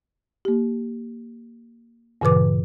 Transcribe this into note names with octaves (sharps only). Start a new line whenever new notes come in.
A#3 G4
G2 A#2 C#3 E3 B4 D6